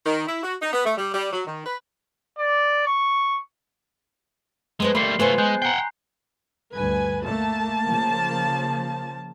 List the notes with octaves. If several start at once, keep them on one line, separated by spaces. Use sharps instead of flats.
D#3
E4
F#4
D#4
B3
A3
G3
G3
F#3
D#3
B4
D5
C#6
G#3 A3 B3 C5
G3 A3 A#3 B5 C6 C7
A3 B3 F4 G#4 C5
G#3 G#5 F#6 G6
F#5 G5 A#5 F#6 C7
D2 G2 B4 G#5
A3 A#3 A5
C#3 F3